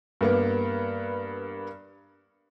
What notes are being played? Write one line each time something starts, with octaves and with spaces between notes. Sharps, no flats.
G2 A#3 B3